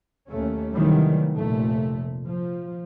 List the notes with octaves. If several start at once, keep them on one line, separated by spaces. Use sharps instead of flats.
D#2 A3 C#4
C3 D#3 E3 F#3 G3 A3
F1 A#1 A#2 A3
F3